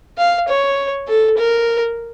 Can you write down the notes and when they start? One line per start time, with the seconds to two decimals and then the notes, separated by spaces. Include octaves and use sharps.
0.18 F5
0.48 C#5
1.08 A4
1.38 A#4